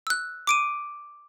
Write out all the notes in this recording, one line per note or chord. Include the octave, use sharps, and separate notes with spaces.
E6 F#6
D6 D7 D#7